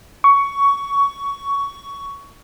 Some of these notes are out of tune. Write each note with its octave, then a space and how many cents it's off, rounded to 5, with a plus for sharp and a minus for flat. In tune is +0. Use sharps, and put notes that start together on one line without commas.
C#6 +15